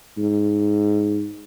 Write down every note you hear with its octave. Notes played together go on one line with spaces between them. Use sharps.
G#2